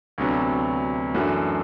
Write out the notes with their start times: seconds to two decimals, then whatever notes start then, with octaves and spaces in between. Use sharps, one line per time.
0.18 D2 C3 F#3 B3 D4
1.14 F#2 E3 A3 D4 F#4